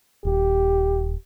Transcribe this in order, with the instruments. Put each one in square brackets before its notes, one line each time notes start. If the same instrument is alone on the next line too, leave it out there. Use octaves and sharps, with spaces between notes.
[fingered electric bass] D#1 [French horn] G4